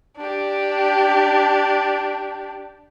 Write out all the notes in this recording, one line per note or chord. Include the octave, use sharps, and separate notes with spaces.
D4 G4